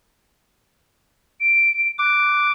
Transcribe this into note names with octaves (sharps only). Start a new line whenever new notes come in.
D7
D6 F#6